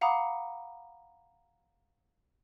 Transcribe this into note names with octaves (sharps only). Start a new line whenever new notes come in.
F5 F#5 A#5 B5 D6 D#6